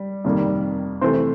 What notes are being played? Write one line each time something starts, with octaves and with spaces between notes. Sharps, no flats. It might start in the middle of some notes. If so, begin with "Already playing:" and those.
Already playing: G3
F2 C3 D#3 G3 A#3
C3 E3 A3 C5